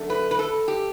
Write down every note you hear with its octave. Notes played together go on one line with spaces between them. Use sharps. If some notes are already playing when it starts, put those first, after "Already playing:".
Already playing: F#2 D3 A3
B4
B4
A4
G4